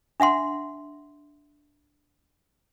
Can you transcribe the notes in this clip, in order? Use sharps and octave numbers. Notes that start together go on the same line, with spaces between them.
D4 E5 F#5 C6